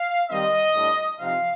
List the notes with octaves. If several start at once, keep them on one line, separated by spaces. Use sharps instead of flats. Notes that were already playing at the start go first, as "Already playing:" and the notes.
Already playing: F5
D#3 G3 C4 D#4 D#5
A2 G3 D4
C3 F3 C4 D#4 F5